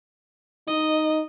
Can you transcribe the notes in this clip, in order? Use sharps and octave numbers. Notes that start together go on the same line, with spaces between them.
D#4 D#5